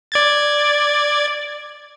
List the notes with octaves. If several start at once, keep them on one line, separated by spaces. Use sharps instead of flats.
D5 G#6 A6